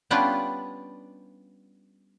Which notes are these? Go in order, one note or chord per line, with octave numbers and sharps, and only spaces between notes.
G3 B3 C#4 D4 F4 G4